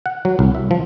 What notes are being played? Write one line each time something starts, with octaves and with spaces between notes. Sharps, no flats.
F#5
F#3
C2
E5
F3